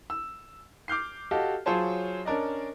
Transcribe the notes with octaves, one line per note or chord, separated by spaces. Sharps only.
E6
D6 F6 G6 C7
F#4 G4 A4 D#5 F5
F#3 F4 G#4 C5 C#5 A5
C#4 D4 A#4 D5 D#5